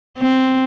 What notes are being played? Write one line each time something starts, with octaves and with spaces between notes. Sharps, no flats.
C4